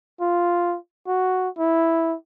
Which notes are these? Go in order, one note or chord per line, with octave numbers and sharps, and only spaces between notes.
F4
F#4
E4